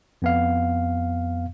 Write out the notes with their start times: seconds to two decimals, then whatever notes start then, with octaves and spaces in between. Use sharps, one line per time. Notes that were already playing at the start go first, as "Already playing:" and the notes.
0.22 F2 B3 F5